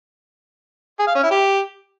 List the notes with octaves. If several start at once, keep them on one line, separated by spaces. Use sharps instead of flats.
G#4
F5
C#4
E4
G4